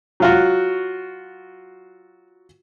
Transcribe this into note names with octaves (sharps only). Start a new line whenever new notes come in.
F#3 F4 F#4